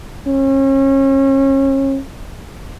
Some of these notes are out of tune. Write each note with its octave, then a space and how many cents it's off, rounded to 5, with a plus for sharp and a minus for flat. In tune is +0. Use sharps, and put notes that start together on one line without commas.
C#4 -35